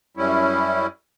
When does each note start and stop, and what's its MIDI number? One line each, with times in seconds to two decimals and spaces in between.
0.17 0.87 42
0.17 0.87 55
0.17 0.87 61
0.17 0.87 64